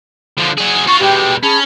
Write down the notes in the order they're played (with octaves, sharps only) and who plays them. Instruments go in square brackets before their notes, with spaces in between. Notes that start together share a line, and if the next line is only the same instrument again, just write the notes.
[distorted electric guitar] D3 F3
F#3 G#4
[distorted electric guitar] F4 F#4 [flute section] C#6
[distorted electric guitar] B2 G#3 [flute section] G4 G5
[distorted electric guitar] C#4 [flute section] G#4 A5 B5